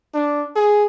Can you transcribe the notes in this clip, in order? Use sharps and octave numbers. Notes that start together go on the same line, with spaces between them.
D4
G#4